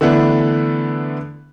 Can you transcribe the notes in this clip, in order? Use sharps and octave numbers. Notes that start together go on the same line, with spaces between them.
D3 E3 A3 B3 D4